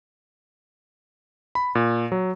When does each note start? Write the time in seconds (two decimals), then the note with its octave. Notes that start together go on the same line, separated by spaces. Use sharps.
1.55 B5
1.75 A#2
2.12 F#3